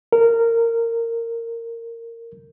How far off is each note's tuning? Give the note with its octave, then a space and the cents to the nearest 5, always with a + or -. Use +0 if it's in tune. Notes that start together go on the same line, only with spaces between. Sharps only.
A#4 -15